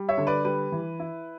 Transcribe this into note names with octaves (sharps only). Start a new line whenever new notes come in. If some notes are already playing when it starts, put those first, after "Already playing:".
Already playing: G3
C#5 E5
D3
B4 D5
G3 B4
E3
E4